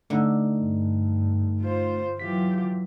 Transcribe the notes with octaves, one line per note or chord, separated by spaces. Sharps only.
D3 A3 D#4
G2
F4 C5
E3 F#3 F4 G4 B6